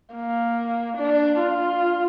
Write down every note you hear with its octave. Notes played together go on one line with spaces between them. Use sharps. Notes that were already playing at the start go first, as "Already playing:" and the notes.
A#3
D4
F4